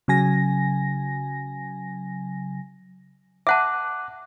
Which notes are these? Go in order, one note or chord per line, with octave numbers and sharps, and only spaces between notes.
C#3 F#3 G#5 A#6
E5 F#5 A5 D6 F#6